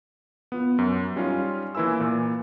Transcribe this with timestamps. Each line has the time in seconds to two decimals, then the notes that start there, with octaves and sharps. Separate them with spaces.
0.52 B3 F4
0.78 F#2
1.16 G3 C#4 D#4 F4
1.75 E3 A#3 E4 B4 G#5 E6
2.00 A#2